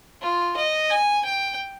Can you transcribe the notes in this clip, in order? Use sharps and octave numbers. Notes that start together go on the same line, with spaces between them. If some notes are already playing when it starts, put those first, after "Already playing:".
F4
D#5
G#5
G5